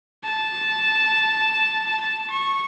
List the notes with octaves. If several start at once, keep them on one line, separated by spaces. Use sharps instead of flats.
A5
A5
C#6